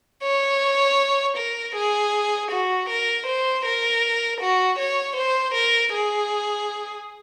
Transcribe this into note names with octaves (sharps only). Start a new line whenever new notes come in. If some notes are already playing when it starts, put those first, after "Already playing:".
C#5
A#4
G#4
F#4
A#4
C5
A#4
F#4
C#5
C5
A#4
G#4